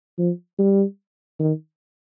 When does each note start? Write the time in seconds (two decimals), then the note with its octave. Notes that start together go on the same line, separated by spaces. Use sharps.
0.18 F3
0.59 G3
1.39 D#3